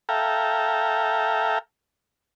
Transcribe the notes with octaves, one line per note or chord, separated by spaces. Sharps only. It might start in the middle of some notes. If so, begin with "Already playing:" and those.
A4 E5 F5 G5 A#5